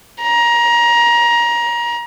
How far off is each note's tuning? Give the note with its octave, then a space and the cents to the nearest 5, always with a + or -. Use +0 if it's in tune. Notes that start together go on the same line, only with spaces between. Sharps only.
A#5 +25